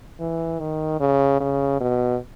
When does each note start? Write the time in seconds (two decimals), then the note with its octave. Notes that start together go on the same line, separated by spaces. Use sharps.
0.20 E3
0.60 D#3
1.00 C#3
1.40 C#3
1.80 B2